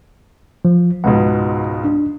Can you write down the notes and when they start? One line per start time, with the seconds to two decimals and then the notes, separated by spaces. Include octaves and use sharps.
0.65 F3
1.04 C#2 G#2 B2 F#5
1.84 D4